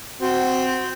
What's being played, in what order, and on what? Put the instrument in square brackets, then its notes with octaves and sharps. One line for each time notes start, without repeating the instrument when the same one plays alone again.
[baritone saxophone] C4 [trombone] F#4